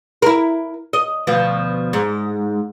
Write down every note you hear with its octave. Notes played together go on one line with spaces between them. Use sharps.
E4 A#4
D#5
D2 B2 F3
G#2